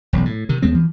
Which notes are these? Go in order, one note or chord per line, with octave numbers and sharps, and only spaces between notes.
E1 B1
A2
C3 D#3
D#2 G#3 B3 C4
E3 F3